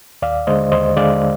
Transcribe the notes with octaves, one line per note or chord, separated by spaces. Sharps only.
D#2 D5 F5
D3 G#3 C5 D#5
D#2 C5 D#5
D3 G#3 D5 F5